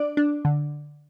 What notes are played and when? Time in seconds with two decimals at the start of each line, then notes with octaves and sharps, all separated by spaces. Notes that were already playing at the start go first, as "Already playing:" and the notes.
Already playing: D4 D5
0.17 D4
0.45 D3